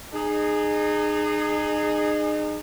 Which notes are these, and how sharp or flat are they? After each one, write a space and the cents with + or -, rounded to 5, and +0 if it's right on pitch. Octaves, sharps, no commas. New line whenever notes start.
D#4 -35 G#4 +0